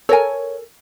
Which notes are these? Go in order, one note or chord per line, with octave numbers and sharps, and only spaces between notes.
A4 A#4 C#5 G#5